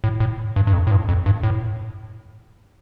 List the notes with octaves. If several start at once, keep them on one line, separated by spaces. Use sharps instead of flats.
A2
A2
G2
G2
F2
A2
G2
F2
G2
A2